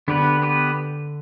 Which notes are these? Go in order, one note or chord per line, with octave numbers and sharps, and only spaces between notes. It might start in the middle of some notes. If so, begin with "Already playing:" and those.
D3 B3 G4 B4
B3 G4 B4